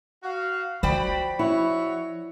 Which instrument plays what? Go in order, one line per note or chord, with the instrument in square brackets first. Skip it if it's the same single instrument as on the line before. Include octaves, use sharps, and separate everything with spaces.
[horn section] F#4 F5
[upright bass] F3 [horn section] F#4 B5 [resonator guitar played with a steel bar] C5 D5 G5
[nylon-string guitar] E4 [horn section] F#4 C#5 E5